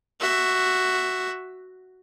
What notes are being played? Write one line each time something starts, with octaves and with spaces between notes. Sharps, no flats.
F#4 E5